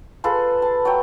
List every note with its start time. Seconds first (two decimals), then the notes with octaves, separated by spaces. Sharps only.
0.24 F4 G#4 A4 B4
0.62 A5
0.85 F#3 C#5 G5